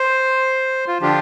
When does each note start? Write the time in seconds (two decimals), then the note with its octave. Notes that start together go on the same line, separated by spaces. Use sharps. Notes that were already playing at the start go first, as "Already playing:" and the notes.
Already playing: C5
0.88 F4
1.01 D3 F3 D4 F4 G4